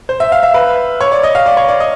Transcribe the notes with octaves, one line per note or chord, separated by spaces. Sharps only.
C5
E5
F5
E5
B4
C#5
D5
D#5
F5
D5
C#5
D5
D#5